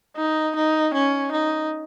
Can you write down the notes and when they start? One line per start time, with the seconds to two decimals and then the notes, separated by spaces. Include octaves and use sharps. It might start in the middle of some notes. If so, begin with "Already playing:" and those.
0.17 D#4
0.56 D#4
0.94 C#4
1.32 D#4